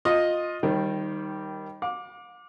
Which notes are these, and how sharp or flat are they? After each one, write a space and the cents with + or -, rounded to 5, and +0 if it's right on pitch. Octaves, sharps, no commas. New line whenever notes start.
F4 +15 D#5 +0
D#3 +0 G3 +0 C5 +45
F5 +45 D6 +0